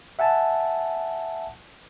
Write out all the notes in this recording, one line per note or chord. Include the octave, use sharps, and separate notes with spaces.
E5 F#5 G#5 A5